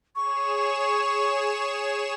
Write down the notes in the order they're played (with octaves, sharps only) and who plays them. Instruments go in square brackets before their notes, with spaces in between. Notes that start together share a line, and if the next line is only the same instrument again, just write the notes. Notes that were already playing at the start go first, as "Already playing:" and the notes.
[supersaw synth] G#4 C#5 E7 [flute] C#6